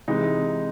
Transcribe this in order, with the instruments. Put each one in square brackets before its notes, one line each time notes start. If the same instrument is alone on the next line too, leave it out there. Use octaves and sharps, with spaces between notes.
[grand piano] C3 E3 G#3 D#4